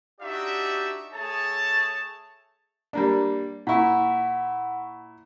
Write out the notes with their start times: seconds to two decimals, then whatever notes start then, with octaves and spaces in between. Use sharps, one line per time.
0.21 D4 D#4 F#4 G4 D5 E5
1.14 A3 G#4 C#5 A5
2.93 G3 A#3 D4
3.67 A#2 E4 F#5 C#6